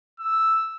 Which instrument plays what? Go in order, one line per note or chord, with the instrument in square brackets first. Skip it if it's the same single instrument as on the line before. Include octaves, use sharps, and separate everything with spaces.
[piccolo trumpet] E6